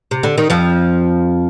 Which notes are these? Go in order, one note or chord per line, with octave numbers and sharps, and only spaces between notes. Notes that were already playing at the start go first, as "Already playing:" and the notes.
C3
D3
D#3
F2 F3